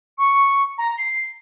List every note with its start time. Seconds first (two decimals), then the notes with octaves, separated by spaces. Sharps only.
0.18 C#6
0.78 A#5
0.98 C7